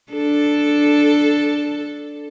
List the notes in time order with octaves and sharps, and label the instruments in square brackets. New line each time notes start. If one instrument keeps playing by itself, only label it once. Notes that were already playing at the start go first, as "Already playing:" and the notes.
[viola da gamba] D4 A4